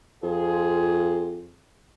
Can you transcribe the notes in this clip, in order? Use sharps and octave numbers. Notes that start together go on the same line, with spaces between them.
F2 F3 F4 G#4